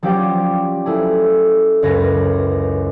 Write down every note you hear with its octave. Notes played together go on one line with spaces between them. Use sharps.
F3 F#3 C#4 G4 C5 D5
A3 E4 G#4
C#2 F#2 B4 C#5 G#6 A#6